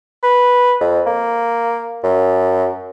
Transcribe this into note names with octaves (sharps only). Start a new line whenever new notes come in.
B4
F2
A#3
F#2